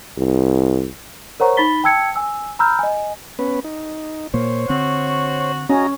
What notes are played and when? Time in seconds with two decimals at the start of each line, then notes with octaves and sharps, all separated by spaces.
0.18 C2
1.40 A#4 C5 C#5 F#5 A#5 C#6
1.57 D#4 B5 A6 B6 G7
1.84 G5 A5 E6 G#6 C#7
2.16 G#5 E6
2.59 A#5 B5 E6 F6 G6
2.79 D#5 G#5
3.39 B3 C#4 B4
3.64 D#4
4.34 A#2 A#3 C5 C#5
4.69 D3 C4 F#4
5.69 C#4 F#4 D#5 A#5